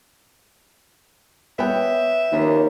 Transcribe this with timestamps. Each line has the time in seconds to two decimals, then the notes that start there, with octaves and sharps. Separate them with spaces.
1.59 B3 C#5 E5 G5
2.32 D#2 F3 A#3 C#4